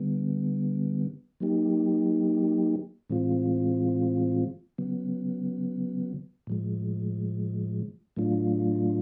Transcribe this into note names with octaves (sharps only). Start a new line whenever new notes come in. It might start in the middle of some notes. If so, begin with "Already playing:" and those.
Already playing: D3 G3 B3
F#3 A#3 D#4 G4
A2 E3 G#3 C4 F4
C#3 F#3 B3
A2 F3 G#3
A2 F#3 A3 D4 F4